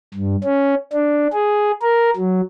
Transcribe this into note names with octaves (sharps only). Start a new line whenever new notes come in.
G2
C#4
D4
G#4
A#4
F#3